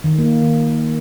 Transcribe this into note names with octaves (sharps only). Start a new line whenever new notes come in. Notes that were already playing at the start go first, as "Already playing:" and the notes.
D#3
A#3
D#3